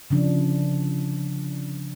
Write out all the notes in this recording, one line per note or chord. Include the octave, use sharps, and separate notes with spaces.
C#3 F3 D4